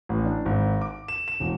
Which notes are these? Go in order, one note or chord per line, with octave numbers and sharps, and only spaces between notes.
A1
D4
G#1
D6
E7
E7
E1